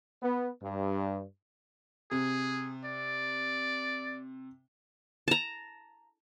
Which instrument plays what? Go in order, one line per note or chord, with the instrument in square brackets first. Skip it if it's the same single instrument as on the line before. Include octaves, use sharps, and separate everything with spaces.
[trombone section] B3
G2
[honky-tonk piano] C3 [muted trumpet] G#4
[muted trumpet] D5
[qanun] A5 A#5